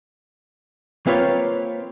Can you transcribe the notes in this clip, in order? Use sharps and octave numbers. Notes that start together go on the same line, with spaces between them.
A#3 C4 F4 B4 C#5